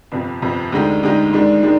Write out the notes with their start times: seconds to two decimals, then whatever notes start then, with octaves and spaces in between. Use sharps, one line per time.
0.12 G1 F2 C3
0.42 G1 F2 C3
0.72 D2 D3 G#3 D#4 G4
1.03 D2 D3 G#3 D#4 G4
1.33 G#2 D#3 G#3 D4
1.63 D#3 G#3 D4